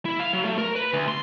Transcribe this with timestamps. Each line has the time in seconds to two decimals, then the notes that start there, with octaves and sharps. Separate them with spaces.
0.05 E4
0.20 F5
0.33 F#3
0.45 A3
0.58 A#4
0.76 B4
0.93 D2
1.08 C6